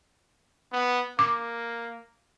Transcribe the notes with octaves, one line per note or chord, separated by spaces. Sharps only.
B3
A#3 D6